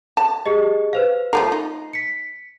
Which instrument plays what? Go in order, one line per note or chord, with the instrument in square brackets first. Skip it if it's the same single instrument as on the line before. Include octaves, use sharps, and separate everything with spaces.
[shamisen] A5
[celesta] G4 G#4 D#5
B4 C5 F5
[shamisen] F3 A3 A#4 [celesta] C7
[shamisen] D#4
[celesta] B6 C#7